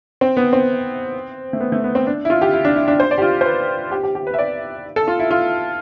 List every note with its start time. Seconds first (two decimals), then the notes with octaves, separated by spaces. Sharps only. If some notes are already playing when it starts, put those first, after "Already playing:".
0.21 C4
0.37 B3
0.53 C4
1.53 A3
1.60 B3
1.72 A3
1.84 B3
1.95 C4
2.07 D4
2.25 E4
2.30 F4
2.42 G4
2.53 E4
2.65 D4
2.76 E4
2.88 D4
3.00 C5
3.11 D5
3.18 G4
3.22 F4
3.41 C5
3.46 B4
3.91 G4
4.03 G4
4.15 G4
4.27 B4
4.34 E5
4.39 D5
4.96 A4
5.08 F4
5.19 E4
5.31 F4